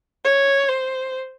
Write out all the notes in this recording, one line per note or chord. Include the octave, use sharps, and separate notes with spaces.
C#5
C5